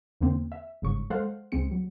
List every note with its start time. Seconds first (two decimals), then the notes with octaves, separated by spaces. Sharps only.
0.20 E2 D3 A#3 C4
0.52 E5
0.82 G1 G#2 C#3 C#6
1.10 G#3 A4 C5 F5 F#5
1.52 C#2 G#3 C4 C#7
1.71 F#3